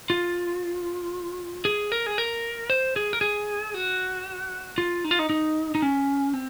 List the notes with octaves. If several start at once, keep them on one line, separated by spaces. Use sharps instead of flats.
F4
G#4
A#4
G#4
A#4
C5
G#4
A#4
G#4
F#4
F4
D#4
F4
D#4
D#4
D#4
C#4
C4